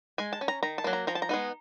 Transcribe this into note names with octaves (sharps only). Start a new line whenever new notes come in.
G#3 G#5
A5
C#4
A#5
D#3 A#5
A5
F#3 A#3
A#5
F3 A#5
A5
A#5
G#3 B3 D#4